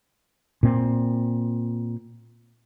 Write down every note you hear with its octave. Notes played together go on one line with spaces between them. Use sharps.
A#2 C4